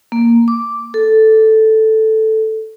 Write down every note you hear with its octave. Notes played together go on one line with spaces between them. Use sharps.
A#3
D6
A4